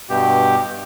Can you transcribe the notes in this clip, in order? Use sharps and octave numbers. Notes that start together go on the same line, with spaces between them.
G2 B2 G4